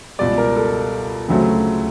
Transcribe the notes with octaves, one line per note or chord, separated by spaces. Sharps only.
C#2 B2 G3 D5
A#4
A4
D2 C#3 F#3 A3 C4